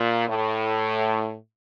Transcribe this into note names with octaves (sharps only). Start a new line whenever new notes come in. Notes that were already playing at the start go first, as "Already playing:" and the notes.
Already playing: A#2
A2